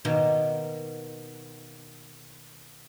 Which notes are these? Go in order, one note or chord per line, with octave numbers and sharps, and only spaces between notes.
B2 D#3 A#3